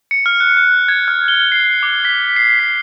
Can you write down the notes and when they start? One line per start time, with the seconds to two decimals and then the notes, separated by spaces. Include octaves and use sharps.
0.11 C#7
0.26 F6
0.40 F#6
0.57 F#6
0.88 G#6
1.08 F6
1.28 G7
1.52 C7
1.83 D6
2.05 B6
2.36 C7
2.59 B6